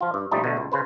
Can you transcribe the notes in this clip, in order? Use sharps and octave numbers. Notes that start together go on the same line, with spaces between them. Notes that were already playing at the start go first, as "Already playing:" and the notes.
F3 F4
G2
A#1 F3 G3 A3 D#4 A5
B2 D3 A3
C#2
C#3 B4 C5